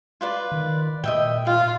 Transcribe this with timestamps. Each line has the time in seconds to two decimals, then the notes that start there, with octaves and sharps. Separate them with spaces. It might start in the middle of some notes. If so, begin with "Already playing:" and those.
0.21 F4 B4 D5
0.52 D#3
1.04 A#2 D#5 E5 G5
1.47 F4 F5